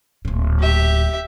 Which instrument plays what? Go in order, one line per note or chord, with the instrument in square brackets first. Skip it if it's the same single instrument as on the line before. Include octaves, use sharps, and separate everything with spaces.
[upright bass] D1 A#2
[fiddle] G4 E5